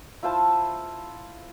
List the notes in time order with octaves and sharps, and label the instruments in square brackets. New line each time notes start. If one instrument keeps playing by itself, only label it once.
[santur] E4 F4 C5 A5